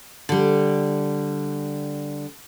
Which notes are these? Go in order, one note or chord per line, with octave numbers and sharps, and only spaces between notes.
D3 G3